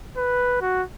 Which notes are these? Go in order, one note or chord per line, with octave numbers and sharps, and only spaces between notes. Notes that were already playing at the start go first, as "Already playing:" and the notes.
B4
F#4